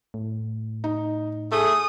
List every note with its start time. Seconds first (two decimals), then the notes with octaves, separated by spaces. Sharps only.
0.14 A2
0.84 D#4
1.52 A3 G#4 A4 D#6